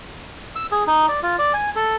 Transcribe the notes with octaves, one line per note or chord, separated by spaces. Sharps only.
E6
G#4
D#4
D5
F4
D5
G#5
A4